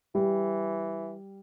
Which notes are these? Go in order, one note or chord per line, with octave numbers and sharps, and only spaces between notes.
E3 G3